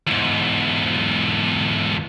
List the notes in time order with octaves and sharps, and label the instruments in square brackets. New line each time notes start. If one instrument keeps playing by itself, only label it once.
[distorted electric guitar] E2 G#2